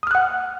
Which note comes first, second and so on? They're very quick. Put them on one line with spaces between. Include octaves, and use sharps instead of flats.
D#6 F6 F#6 F#5